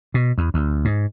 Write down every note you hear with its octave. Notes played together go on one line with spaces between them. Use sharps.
B2
E2
D2
G#2